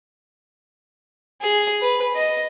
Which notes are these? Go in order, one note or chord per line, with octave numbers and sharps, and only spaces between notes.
G#4
B4
D#5